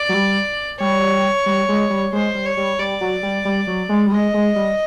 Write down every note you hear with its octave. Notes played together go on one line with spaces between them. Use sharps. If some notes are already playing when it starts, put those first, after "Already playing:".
Already playing: D5
F#3
G3
G3 C#5
G3
G#3
G3
G#3 C5
G3
C#5
G3
G3 D5
F#3
G3
G3
F#3
G#3
G3
G#3 D#5
G#3
G3